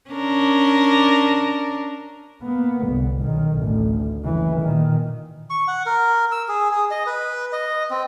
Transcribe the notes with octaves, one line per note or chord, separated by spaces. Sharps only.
C#4 D4 A#4
A#3 B3
G1 C2
B1 D#3
A1 D2
F#1 E3
A#2 D#3
C#6
F#5
A#4
E6
G#4
G#4
D#5
B4
D#5
C4